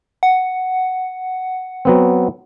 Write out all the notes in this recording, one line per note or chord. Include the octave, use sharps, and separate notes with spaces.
F#5
F#3 B3 C4